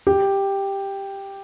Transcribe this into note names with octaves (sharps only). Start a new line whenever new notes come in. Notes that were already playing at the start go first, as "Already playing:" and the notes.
G4